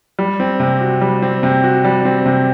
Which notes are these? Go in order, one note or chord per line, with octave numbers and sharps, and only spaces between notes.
G3
C4
C3
F#4
G3
C4
C3
F#4
G3
C4
C3